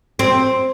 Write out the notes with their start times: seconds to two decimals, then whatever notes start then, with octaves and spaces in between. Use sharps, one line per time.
0.19 C4